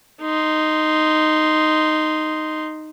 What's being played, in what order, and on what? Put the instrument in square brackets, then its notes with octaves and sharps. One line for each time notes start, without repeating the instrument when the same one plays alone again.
[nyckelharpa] D#4 C6